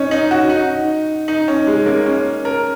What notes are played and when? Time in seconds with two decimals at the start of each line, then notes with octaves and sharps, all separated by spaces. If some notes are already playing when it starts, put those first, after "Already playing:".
Already playing: C#4 D#4
0.11 D#4
0.31 F#4
0.50 D#4
1.28 D#4
1.48 C#4
1.67 G#3
1.86 A#3
2.06 C#4
2.45 A#4